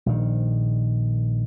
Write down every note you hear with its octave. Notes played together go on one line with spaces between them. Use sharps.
A#1 D#3